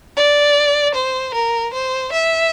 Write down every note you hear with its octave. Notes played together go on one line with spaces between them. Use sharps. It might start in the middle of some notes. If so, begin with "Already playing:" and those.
D5
C5
A#4
C5
E5